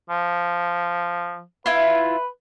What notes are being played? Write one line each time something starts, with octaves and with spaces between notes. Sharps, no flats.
F3
E4 F4 B4